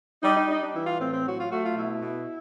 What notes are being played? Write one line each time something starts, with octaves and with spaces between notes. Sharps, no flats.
G3 D#4
D#4
G3 D#4
D4
E3 E4
F4
A2 C4
C4
F#3 F#4
F4
A3 F#4
F4
B2 E4
B2